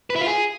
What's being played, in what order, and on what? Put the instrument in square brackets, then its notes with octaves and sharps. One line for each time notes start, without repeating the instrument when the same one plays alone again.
[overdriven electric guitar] B4
E4
F4
G#4